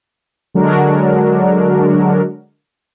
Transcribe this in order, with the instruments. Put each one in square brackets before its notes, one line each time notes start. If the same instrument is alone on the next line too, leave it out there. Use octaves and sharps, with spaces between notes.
[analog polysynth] D3 F#3 G#3 D4 F#4 A#4